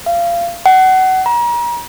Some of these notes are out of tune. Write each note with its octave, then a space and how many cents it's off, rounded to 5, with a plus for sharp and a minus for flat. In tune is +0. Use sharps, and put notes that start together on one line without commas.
F5 -25
F#5 +25
A#5 +35